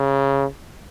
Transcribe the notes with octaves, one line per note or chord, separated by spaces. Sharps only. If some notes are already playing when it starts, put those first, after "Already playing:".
Already playing: C#3